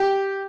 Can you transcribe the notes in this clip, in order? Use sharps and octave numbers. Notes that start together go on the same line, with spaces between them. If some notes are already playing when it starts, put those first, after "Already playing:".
Already playing: G4